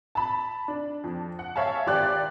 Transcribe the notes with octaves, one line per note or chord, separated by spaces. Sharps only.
A5 B5
D4
F2
F#5
C#5 E5 F5 G#5 A5
G#1 G4 D5 F#6